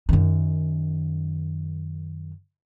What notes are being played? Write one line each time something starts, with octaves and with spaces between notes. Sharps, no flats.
F#2 D#3